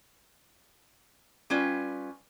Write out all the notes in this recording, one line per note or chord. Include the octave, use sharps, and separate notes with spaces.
G3 C#4 F4 B4